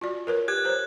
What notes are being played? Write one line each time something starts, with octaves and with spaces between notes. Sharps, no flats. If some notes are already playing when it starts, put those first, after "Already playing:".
F4 F#4 D5
A#4 B4 C#5
G4 F#6 G#6
C5 C#5